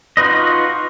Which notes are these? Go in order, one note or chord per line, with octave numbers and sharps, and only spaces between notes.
D#4 F4 F#4 B4 D#5